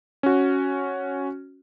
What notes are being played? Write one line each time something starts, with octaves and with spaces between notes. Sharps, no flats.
C#4 F#4